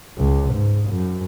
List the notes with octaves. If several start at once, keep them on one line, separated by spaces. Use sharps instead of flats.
C#2
G#2
F#2